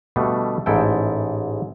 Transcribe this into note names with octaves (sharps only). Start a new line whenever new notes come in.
B2 D3 G3 A3
A1 G#2 E4 A4 G5